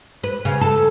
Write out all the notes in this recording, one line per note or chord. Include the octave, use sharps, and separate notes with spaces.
B4
C#3
A4